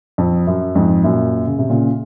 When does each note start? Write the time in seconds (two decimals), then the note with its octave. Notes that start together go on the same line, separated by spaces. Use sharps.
0.18 F2
0.47 F#2
0.75 F2 G#2
1.04 F#2 A#2
1.47 C#3
1.59 C3
1.70 A#2 C#3